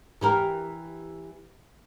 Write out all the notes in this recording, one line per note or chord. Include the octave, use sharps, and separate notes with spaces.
E3 G4 A#4